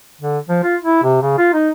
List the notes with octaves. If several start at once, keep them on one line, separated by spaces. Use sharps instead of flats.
D3
F3
F4
E4
C3
C#3
F4
D#4